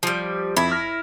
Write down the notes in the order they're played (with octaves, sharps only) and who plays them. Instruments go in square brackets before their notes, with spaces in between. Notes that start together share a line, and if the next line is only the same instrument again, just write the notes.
[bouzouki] F3 G3
[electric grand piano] F2 B5 G#6 [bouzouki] E4
[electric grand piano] F6 A#6